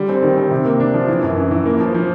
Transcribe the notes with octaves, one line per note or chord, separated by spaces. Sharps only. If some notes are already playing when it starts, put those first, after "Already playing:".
Already playing: D3 G3
C4
D#3
C4
C3
A#3
D4
F3
E3
F#2
E3
E3
A#3
F3
F3